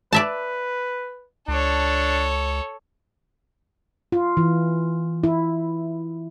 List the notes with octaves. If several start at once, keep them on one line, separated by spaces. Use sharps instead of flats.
B4 D5 E5 A5
C#2 D4 A4 C#5
F4
E3
E4